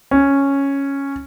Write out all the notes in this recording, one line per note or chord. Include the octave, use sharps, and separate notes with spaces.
C#4